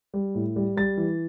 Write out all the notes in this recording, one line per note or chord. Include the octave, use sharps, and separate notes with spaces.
G3
A2
G3
G3 A6
E3